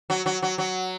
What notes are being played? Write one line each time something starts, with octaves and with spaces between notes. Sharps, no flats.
F#3
F#3
F#3
F#3